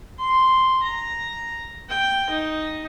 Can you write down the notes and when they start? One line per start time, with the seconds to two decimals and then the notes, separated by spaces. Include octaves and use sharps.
0.19 C6
0.82 A#5
1.89 G5
2.30 D#4